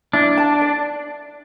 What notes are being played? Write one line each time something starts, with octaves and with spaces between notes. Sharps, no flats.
D4 E4
A5
D5